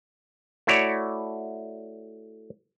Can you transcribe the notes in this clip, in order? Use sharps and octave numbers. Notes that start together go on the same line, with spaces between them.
A3 E4 F#4 C#5 D5